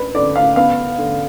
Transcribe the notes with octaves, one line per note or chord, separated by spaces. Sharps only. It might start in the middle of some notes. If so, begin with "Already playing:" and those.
Already playing: D4 B4
D3 D5
F5
B3 F5
D3